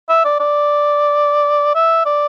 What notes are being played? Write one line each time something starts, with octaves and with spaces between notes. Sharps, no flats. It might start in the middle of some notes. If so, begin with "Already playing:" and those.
E5
D5
D5
E5
D5